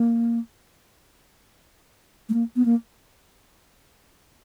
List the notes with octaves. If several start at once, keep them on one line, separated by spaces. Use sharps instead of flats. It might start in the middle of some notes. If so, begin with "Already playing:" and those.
Already playing: A#3
A3
A#3
B3
A#3